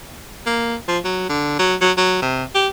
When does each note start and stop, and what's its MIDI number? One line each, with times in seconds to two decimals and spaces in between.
0.46 0.76 58
0.88 0.99 53
1.05 1.26 54
1.30 1.56 50
1.59 1.75 54
1.81 1.92 54
1.98 2.19 54
2.22 2.44 48
2.55 2.68 67